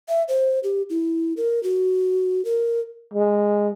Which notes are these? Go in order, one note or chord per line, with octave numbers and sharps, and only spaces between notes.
E5
C5
G4
E4
A#4
F#4
A#4
G#3